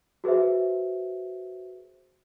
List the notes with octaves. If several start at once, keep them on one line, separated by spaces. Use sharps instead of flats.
F#4 G#4 B4 C5 E5